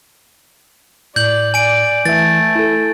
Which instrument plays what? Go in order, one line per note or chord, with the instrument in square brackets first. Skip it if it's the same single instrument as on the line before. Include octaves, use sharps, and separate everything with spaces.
[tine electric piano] A2 [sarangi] D5 [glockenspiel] G6 F#7
[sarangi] D5 [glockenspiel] G#5 D7
[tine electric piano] E3 E5 [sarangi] A3 [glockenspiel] A6
[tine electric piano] E4 A4